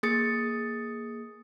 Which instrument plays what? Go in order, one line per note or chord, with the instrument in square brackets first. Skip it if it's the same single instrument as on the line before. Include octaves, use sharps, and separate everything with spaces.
[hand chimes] A#3 G#4 D#6 A6 C#7